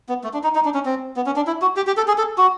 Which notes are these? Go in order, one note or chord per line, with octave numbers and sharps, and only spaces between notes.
B3
A3
D4
D#4
D#4
D4
C#4
C4
B3
C#4
D4
E4
F#4
G4
G4
A4
G#4
A4
F#4